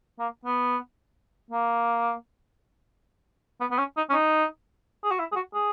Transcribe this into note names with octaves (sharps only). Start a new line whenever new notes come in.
A#3
B3
A#3
B3
B3
C#4
D#4
C#4
D#4
G#4
F#4
E4
G#4
F#4
G#4